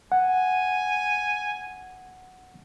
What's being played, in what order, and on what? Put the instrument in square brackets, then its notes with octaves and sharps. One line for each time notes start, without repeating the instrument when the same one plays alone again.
[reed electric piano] F#5 [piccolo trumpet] G#5